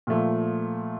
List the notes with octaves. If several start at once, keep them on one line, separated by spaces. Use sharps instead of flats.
A#2 F3 A3